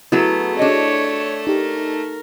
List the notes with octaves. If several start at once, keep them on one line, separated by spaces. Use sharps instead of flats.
F#3 A3 B3 E4 F#4 G#4 A4
D4 C#5 D#5
D#4 G4 A#4